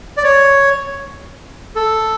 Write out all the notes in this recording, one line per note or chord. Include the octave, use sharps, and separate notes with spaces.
D5
C#5
A4